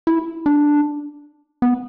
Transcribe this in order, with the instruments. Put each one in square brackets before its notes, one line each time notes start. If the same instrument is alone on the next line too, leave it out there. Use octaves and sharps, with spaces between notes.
[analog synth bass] E4
D4
B3